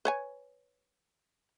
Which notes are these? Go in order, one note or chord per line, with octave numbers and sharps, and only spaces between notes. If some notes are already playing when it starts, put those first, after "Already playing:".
B4 C#5 G#5